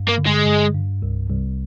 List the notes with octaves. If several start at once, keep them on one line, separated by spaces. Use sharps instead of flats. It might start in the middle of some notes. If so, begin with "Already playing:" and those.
Already playing: G2
A#3
D3
G#3
G2
G2
C2
C2